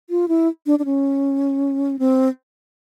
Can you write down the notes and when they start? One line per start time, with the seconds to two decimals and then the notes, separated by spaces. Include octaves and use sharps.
0.10 F4
0.28 E4
0.66 D4
0.79 D4
0.85 C#4
1.99 C4